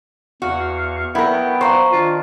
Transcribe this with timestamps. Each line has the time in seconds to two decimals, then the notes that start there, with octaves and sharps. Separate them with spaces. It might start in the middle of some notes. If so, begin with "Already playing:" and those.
0.42 E2 F#4 F5 C#6
1.15 F#3 B3 E4 A#4 G5
1.61 C5 F5 A#5 C#6
1.92 D#3 D4 F4